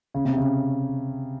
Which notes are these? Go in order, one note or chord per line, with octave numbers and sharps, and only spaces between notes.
C#3
C3
C#3